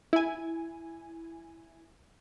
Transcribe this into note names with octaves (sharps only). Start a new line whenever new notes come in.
E4 G#5